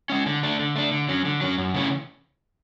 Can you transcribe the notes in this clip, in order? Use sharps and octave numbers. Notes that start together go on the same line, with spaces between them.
G#3 C#4
D3
A3 D4
D3
A3 D4
D3
F#3 C#4
D3
F#3 C#4
F#2
C#3 E3 A3 C#4